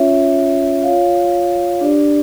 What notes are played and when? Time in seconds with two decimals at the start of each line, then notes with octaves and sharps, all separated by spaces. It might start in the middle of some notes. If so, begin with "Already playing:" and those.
Already playing: C#4 F4 C#5 E5
0.83 F4 C#5 F5
1.81 D4 G4 D5